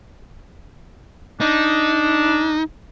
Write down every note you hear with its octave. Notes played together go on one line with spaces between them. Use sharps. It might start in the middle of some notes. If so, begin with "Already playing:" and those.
D4 D#4